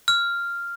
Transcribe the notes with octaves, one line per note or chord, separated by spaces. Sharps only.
F6